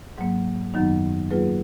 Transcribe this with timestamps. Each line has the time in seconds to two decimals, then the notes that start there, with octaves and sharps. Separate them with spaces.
0.18 G#2 F#3 A#3
0.74 F#2 D#3 F#3 B3 D#4
1.31 F#3 A#3 F4 G#4 B4